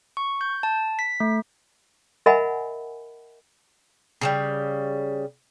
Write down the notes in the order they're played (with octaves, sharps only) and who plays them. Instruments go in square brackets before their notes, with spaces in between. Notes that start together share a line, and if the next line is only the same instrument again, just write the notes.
[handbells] C#6
G6
A5
B6
A3
[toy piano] A#4 D#5 E5 F#5 G#5 B5
[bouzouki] C#3 E3 G3